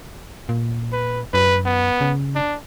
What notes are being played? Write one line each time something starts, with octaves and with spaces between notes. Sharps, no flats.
A#2
B4
F#2 B4
B3
C#3
D4